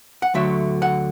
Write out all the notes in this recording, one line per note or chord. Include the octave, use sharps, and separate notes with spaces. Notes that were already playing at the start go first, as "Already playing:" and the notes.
F#5
D2 D3 F#3 A3 E5
F#5